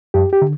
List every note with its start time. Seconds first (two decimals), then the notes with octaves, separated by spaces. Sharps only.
0.14 F#2 G4
0.33 G4
0.42 D3